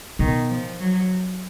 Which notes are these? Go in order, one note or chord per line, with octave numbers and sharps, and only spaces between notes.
B2 D#3
F3
F#3